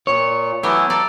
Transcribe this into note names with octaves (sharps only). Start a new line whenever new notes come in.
A#2 C#5
E3 F#3 A3 B3 E4 G4 G#5
A4 D5 A#5